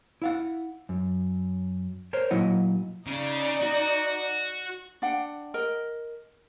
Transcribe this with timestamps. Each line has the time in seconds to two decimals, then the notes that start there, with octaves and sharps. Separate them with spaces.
0.22 E4 F5 F#5
0.89 F#2
2.13 A#4 C5 C#5
2.31 A#2 F#3 E4 D#5 F#5
3.07 C#3 D#4 D5
3.63 F#4
5.02 D4 F#5 G5
5.54 A#4 D#5